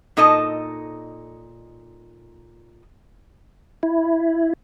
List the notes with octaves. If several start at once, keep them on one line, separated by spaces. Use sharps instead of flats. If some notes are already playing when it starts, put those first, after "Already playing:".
A#2 D#4 A4 D#5 A5
E4